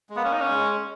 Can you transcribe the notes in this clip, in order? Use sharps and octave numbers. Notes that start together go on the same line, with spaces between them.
G#3
A#3 B3
C#4
D#4
C#4
G#3